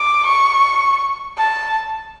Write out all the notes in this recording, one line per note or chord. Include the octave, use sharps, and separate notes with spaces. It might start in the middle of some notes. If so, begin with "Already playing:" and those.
Already playing: D6
C#6
A5